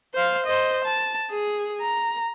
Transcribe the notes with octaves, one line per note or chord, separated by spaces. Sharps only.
C5 F5
C5 D#5
A5
G#4
A#5